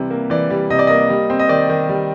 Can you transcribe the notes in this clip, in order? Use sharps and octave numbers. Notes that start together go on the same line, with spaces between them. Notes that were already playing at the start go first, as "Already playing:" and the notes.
Already playing: C3 E3 G3
A#3
E3 D5
G3
C3 D#5
D5
A#3 D#5
G3
C4
D#5
D#3 D5
D#3
G3